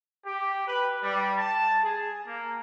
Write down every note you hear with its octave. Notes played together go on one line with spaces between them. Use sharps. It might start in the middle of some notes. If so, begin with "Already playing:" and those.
G4
B4
G3
A5
G#4
A#3